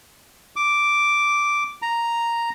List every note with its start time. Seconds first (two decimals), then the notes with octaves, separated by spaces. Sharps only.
0.56 D6
1.82 A#5